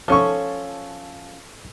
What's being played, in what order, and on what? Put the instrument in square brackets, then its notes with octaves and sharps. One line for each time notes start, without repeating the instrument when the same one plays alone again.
[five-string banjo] F3 C#4 [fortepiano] A4 C#6